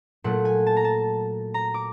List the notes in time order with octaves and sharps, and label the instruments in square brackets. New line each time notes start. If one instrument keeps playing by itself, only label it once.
[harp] A#2 F#3 A3 F#5
G#5
A5
A#5
A5
A#5
D6